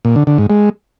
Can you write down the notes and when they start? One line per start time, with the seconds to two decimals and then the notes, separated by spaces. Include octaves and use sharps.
0.05 A#2
0.16 D3
0.27 D3
0.38 G#2
0.50 G#3